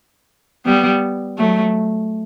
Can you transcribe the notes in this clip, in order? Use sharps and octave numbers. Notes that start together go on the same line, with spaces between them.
G3 B3
F#3 A3